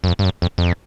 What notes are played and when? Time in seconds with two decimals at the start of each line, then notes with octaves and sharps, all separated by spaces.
0.04 F#2
0.08 F2
0.19 G2
0.25 F#2
0.42 F2
0.58 F2